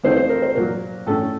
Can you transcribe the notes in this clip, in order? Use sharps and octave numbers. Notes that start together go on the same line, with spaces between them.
F2 D#3 A3 D#4 C5
C5
A#4
C5
A#2 F#3 A#3 A#4
A2 A3 C#4 A4